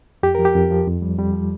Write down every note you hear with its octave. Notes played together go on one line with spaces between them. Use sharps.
F2 G4
F3 A#4
G4
F2
F3
F2
F3 G3
F2 G3
F3